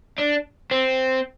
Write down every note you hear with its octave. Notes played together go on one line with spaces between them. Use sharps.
D4
C4